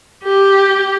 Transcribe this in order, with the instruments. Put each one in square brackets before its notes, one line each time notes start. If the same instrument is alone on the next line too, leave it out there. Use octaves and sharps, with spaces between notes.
[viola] G4